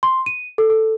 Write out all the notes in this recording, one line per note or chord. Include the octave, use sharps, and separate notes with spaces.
C6
D#7
A4
A4